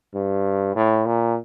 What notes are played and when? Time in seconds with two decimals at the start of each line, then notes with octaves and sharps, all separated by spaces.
0.14 G2
0.75 A2
1.05 A#2